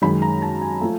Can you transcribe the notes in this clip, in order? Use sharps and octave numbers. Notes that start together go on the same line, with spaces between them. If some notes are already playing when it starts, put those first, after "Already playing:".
F#2 D#3 G#3 B5
A#5
A5
G#5
F3 A3